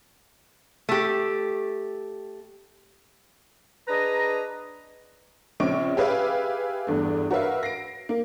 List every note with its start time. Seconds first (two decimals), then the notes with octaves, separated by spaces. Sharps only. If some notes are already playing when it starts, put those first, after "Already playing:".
0.89 A3 G4
3.88 D4 G#4 B4 D#5 A#5
5.60 A#1 C#3 C4 C#4 C#6 D7
5.97 G4 G#4 B4 E5 F5
6.87 E2 G2 A3
7.31 F#4 A#4 B4 E5 F5
7.63 A#6 C7 D7
8.09 A#3